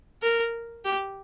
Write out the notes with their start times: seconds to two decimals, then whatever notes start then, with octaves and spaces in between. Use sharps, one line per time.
0.22 A#4
0.85 G4